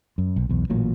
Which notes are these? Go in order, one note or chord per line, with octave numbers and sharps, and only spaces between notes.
F#2
B1
B1 E2
A1 A#2 F#3